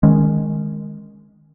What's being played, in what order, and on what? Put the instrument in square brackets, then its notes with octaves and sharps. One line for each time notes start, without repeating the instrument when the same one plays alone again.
[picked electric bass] D#3 G#3 C#4